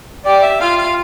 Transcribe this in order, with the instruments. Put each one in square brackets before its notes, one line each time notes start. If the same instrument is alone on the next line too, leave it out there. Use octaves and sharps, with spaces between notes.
[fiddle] G4 [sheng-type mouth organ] D5
[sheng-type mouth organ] E5
[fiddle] F4 [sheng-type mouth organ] F5
[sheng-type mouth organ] F5